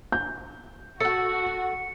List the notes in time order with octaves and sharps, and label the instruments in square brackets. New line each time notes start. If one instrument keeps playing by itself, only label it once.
[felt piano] G6
[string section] F#4 [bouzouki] A4 F#5 [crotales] C#7